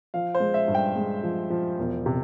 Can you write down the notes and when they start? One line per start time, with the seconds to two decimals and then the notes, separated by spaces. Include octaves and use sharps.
0.14 F3 F5
0.35 C5
0.40 G#3
0.54 E5
0.68 G2
0.75 G5
0.96 G#3
1.23 F3
1.50 F3
1.79 E1
2.06 C3